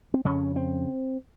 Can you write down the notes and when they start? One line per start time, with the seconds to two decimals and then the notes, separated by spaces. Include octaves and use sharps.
0.14 C4
0.25 F2 C#3 C#4
0.56 C4